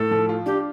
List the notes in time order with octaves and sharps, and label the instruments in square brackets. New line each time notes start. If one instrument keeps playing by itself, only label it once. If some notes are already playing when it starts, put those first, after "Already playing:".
Already playing: [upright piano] A2 [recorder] A4
[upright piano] F3
F4
[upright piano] D4 [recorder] G4